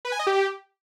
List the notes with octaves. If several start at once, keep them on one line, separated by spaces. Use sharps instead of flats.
B4
G#5
D#5
G4